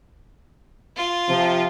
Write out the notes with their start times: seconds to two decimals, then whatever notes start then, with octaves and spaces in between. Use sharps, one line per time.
0.96 F4
1.28 C3 F3